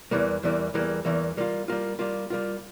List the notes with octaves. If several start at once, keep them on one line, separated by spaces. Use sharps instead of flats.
E2 E3 G3 A#3
E2 E3 G3 A#3
E2 E3 G3 A#3
E2 E3 G3 A#3
G3 A#3 F4
G3 A#3 F4
G3 A#3 F4
G3 A#3 F4